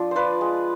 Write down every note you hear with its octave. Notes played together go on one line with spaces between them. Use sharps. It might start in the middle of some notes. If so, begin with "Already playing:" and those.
Already playing: F3 D4
F4 B4 C5 D5
G#3